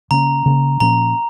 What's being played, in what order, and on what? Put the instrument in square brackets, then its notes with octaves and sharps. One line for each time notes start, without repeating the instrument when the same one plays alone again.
[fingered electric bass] C#3 A#3 C#4 [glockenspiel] A#5
[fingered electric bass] C#3 A#3 C#4
[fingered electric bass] A#2 F3 A#3 C#4 [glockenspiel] A#5